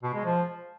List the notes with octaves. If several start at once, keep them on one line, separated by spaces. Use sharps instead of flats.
B2
G#3
F3